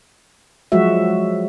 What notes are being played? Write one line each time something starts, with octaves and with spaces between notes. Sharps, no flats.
F3 F#3 G#3 F#4 E5